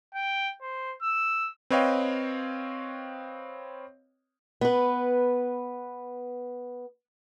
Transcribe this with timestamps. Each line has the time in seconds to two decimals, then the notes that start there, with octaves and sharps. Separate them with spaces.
0.15 G5
0.62 C5
1.02 E6
1.70 C4 B4 C#5 D#5 F5 G5
4.61 B3 B4